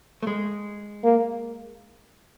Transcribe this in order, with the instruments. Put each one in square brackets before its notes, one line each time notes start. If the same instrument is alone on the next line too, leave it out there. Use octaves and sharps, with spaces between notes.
[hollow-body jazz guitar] A3
G#3
[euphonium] A#3